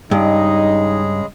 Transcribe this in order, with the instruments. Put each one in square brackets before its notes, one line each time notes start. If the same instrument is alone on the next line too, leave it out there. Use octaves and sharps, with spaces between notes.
[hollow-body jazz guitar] G2 [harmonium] C#3 G#3 G#4 [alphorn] D#4